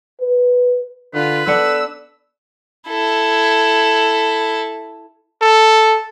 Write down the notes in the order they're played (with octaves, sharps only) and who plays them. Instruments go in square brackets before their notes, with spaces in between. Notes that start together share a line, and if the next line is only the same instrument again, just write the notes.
[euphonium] B4
[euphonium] D3 [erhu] F4 [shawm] B4
[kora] B3 D4 F#5 [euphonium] A4 [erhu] E6
[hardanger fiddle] E4 A4
[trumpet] A4